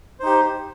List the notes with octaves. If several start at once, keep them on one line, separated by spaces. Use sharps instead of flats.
D#4 G4 C5